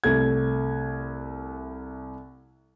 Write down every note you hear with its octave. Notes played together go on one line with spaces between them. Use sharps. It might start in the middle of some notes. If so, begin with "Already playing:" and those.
C2 A3 G#6